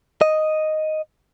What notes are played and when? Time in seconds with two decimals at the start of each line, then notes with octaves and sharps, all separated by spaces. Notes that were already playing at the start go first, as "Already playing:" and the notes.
0.21 D#5